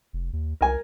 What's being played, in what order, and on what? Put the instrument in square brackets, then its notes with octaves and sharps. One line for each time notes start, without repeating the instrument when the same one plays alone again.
[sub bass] F1
D#2
[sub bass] C2 [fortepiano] A#4 G#5